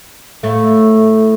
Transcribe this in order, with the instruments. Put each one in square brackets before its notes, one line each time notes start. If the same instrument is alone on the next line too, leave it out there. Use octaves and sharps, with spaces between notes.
[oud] A2 A3